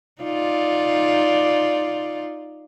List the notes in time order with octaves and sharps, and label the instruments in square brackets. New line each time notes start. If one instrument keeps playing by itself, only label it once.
[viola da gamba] D#4 F4 D5